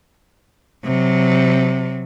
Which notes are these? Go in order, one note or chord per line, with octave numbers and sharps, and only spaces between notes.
C3 F#3